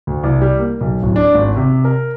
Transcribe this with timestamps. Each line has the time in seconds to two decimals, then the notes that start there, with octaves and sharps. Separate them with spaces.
0.07 D2
0.23 C2
0.42 G3
0.60 A#3
0.81 B1
1.03 D1
1.16 D4
1.35 G#1
1.56 C3
1.85 A#4